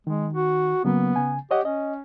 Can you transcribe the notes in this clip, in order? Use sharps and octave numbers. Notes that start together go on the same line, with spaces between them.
D#3 G#3
F#4
C#3 F#3 A#3 B3
C#3 G#5
G4 C#5 D#5 F#5
C#4 D#5